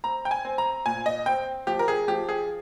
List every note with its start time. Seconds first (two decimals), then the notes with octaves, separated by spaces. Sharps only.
0.04 C4 A#5
0.25 G5
0.31 G#5
0.45 C4
0.58 A#5
0.86 A#2 G#5
1.06 D#5
1.26 C4 G5
1.67 F3 G4
1.79 A#4
1.88 G#4
2.08 F3 G4
2.29 G#4